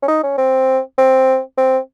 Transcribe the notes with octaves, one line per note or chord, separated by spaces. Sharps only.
C#4
D#4
C#4
C4
C4
C4